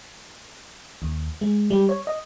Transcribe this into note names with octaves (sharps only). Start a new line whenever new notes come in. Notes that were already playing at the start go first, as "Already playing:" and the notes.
D#2
G#3
G3
C#5
D#5